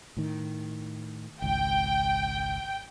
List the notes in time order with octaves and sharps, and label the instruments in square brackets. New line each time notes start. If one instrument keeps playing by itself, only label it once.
[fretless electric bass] A2 D#3
[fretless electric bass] G#1 C#2 [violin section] G5